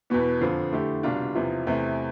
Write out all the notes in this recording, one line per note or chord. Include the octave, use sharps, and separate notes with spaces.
E2 B2 B3
F2 D3 F3
D3 A3 E4 G4
C2 B2 G3 D4 F4
E2 C3 F3
E2 C3 E3 A3